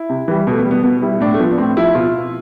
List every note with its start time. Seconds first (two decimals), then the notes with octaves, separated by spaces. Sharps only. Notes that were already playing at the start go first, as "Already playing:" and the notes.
Already playing: E4
0.10 C3
0.28 E3 G3
0.47 B2 A3
0.59 B3
0.65 G3
0.71 B3
0.83 B2 B3
1.02 G3 E4
1.20 A2 D4
1.34 A3
1.39 F3 B3
1.51 B3
1.58 A2 C4
1.77 F3 E4
1.95 B2 F4